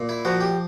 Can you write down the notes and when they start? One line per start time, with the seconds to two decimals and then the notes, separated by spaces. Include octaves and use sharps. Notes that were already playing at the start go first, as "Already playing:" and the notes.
Already playing: A#2
0.09 E4
0.25 F3 F#4
0.40 G4